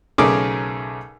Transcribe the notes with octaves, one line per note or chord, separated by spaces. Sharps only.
B1 C#3 A3 G#4 A#4 D6